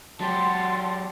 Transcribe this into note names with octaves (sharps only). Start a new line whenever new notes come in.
F#3 G4 F#5 A5 C6